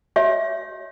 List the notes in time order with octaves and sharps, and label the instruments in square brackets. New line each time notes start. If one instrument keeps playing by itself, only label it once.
[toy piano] F#4 C#5 E5